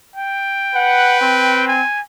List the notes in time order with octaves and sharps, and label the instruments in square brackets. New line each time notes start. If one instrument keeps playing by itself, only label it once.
[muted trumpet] G5
[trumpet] B4 [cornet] F#5
[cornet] C4
[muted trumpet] G#5